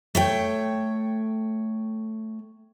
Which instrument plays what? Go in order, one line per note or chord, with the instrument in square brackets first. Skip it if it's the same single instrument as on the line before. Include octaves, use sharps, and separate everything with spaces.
[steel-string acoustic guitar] A3 C#5 G5